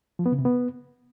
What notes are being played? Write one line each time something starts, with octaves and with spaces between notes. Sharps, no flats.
F3
B3
C#3
C3
B3